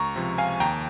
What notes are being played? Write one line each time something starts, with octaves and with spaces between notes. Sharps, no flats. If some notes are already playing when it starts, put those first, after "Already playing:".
Already playing: C#2 A#5 C#6
C3 F3
F5 G#5
D#2 G5 A#5